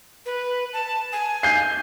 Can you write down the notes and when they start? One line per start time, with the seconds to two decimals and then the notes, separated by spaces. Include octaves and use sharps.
0.26 B4
0.73 A5
1.13 G#5
1.43 G6 C7